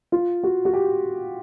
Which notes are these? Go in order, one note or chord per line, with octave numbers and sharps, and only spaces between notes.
F4
F#4
F#4
G4